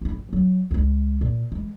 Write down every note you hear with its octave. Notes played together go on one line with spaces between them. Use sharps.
E4 F4
A1
F#3
C#2 G#3
A#2
E3 G#3